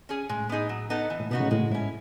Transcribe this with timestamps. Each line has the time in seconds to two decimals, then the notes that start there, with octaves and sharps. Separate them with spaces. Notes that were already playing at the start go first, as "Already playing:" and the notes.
0.09 C#4 G#4
0.29 A2 G#3
0.49 B3 D#4 G#4
0.69 F#3
0.90 B3 D#4 A4
1.10 E3
1.20 A2
1.31 B2 B3 D#4 F#4
1.40 A2 C#3
1.51 A2 G#3
1.71 G#2 C#4 E4